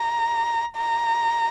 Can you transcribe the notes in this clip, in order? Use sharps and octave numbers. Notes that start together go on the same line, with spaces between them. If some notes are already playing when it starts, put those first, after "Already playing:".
Already playing: A#5
A#5